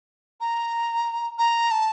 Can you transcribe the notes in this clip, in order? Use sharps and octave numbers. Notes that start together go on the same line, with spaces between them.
A#5
A#5
A5